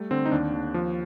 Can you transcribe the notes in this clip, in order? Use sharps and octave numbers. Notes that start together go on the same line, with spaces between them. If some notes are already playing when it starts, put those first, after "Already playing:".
Already playing: G3 A3
D3 C4
D#4
D#2 D4
D#2
F3